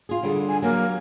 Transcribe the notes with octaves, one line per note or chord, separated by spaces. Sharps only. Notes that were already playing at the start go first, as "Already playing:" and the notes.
F4 G#4
D3 G3 G#4
G#5
F#3 A#3